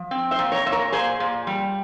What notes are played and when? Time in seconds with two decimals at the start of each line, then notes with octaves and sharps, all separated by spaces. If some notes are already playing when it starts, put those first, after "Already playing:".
Already playing: F3
0.11 C4
0.31 C5 E5
0.39 A#2
0.52 A#4 C#5
0.66 A#2 E5
0.72 A#4 C#5
0.92 A#2 G#4 C5
1.20 A#2
1.47 G3